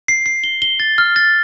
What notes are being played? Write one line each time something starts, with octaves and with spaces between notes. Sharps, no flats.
C7
C7
G7
G7
A6
F6
A6